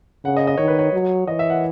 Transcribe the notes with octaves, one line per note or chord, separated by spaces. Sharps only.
C#3 F#5
D#5
D#5
D#3 C#5
B4
C#5
F#3
E3 D#5
E5
F#5